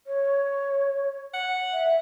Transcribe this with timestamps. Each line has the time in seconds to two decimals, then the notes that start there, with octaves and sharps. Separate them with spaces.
0.07 C#5
1.34 F#5
1.73 E5